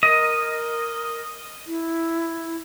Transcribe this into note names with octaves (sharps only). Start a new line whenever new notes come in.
A#4 D#5
E4